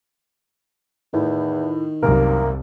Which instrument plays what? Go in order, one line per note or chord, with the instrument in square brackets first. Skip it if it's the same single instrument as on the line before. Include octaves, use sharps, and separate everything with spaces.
[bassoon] E2 [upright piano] A2 [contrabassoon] D#3
[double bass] C2 [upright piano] F#2 C3 A#4 [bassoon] A#3